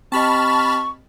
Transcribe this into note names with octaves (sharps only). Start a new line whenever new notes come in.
C4 G4 D#5 A5 B5 C#6 F6